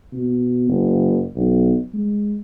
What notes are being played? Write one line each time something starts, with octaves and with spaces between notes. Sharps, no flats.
B2
F#1
B1
G#3